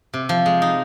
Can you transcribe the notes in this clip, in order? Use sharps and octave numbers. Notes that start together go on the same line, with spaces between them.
C3
F3
G#3
D#4